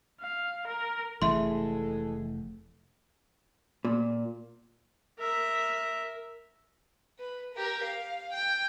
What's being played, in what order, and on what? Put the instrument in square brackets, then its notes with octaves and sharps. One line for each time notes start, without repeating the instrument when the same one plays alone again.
[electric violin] F5
A#4
[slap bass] F1 A3 [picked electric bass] E3 [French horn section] G#3 G#4 A4 [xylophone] E5 C6
[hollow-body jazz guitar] A#2
[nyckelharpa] A#4 E5
[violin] B4
G4 A#4
F5
G5